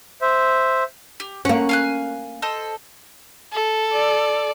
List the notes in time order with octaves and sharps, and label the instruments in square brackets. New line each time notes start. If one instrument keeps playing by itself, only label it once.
[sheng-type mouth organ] C5 E5
[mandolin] G4
[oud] A#3 C#4 [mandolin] F#5
[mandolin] F5 G#5 F#6
A4 C5 D#5
[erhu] A4
[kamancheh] D5